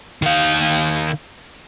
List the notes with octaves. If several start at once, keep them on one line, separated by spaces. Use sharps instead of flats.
D#3 F5